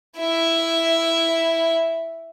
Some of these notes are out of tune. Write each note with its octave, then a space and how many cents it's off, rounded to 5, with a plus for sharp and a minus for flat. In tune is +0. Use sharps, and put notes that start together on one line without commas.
E4 +0 E5 +0